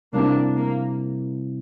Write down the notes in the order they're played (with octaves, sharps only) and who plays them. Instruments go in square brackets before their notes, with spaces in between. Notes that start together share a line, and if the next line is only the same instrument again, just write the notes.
[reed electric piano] C3 G3 C4 E4 [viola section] A#3 D4
[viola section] A#3